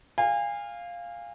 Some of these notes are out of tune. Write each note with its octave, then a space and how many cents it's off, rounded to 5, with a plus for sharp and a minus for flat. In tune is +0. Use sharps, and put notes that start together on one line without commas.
F5 +0 G#5 -30